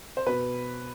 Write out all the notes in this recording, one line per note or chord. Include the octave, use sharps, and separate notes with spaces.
C5
B2 B4